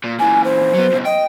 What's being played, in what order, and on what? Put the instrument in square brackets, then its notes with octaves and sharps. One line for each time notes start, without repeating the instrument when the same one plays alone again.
[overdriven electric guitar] A#2
[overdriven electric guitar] A#2 E3 [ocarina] G#5
[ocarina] C5
[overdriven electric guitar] F#3 B3
C#2 B2
[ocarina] D#5 [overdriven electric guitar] G5